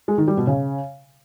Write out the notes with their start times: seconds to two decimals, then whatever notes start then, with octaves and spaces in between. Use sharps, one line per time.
0.08 G#3
0.18 D#3
0.28 G3
0.37 B2
0.47 C#3